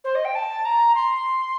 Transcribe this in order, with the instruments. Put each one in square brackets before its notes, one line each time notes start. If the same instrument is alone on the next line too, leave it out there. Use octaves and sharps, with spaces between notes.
[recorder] C5
D#5
G5
A5
A#5
C6